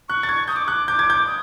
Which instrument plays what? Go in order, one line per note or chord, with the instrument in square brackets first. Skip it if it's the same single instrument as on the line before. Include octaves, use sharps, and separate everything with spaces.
[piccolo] C#6 [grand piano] F#6
[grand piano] A6
G#6
[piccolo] D#6 [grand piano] G6
[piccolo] D6
C#6
[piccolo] D6 [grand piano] F#6
[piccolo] D6 [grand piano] G6
[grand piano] G#6
G6
[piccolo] D#6